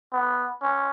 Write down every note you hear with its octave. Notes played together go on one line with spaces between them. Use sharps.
B3
C#4